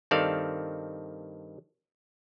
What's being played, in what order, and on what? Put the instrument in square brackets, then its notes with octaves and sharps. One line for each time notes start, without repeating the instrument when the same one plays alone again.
[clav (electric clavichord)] G2 D#3 C4 A4 D5 F5